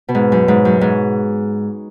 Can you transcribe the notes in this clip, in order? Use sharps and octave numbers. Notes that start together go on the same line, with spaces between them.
B2
G#2
F#2
G#2
F#2
G#2